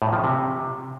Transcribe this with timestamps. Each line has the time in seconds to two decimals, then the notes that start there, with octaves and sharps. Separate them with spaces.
0.02 A2
0.07 A#2
0.13 F3
0.18 C#3
0.24 C3